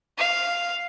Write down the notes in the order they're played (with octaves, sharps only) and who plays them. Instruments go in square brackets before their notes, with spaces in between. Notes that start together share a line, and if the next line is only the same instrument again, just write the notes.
[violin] F5